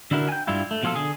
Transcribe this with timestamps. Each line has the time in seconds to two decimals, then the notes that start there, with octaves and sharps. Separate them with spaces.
0.11 D3 D4 E4 F#4 A#4
0.29 G5 G#5
0.47 G2 G3 E4 F4
0.71 A3
0.83 B2 F3 F4 G#4 A4
0.95 D3 G#4